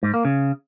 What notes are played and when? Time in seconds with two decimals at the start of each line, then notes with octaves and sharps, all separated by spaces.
0.03 G#2
0.14 A#3
0.25 C#3